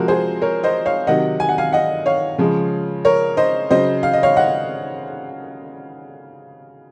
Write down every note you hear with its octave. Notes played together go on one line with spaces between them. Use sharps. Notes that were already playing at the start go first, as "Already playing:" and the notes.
Already playing: C3 F3 G#3 F#4 A#4
G#4 C5
A#4 C#5
C5 D#5
C#5 F5
C3 D#3 F#3 D#5 F#5
G#5
F#5
F5 G#5
D#5 F#5
C#5 F5
C#3 F3 G#3
A#4 C#5
C5 D#5
C#3 F#3 C5 D#5
F5
D#5
C#5 F5
D#5 F#5